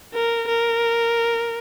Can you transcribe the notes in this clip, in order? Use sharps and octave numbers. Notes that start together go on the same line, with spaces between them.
A#4
A#4